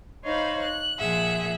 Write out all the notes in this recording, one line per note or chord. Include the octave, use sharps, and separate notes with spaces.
D#4 C5 C#5 F5 B5
F#6
A#2 F3 G#4 E5 F#5